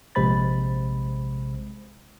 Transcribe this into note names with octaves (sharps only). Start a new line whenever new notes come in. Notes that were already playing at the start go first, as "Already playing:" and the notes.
A#1 C3 G#3 C5 B5 A6